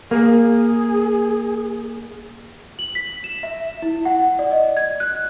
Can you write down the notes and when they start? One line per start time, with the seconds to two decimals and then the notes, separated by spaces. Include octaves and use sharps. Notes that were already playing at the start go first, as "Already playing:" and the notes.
0.11 A#3 G#4
2.79 F#7
2.95 B6
3.24 E7
3.43 E5
3.82 E4
4.05 F#5
4.39 D5
4.51 D#5
4.77 G#6
5.00 F#6